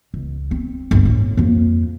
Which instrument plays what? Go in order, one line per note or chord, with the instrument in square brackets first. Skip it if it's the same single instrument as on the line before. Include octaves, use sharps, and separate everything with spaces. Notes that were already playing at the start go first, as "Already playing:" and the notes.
[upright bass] C#2
C4
G1 D2
A2
F2 A#3